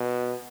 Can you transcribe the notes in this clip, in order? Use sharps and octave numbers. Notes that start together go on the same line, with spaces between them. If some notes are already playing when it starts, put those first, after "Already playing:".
Already playing: B2